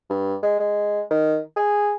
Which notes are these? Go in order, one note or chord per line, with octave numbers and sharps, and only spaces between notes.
G2
G#3
G#3
D#3
G#4